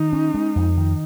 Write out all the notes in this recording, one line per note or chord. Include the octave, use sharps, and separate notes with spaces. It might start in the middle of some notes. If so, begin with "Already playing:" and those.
Already playing: D#3 D#4
C#4
G#3
F2
D#3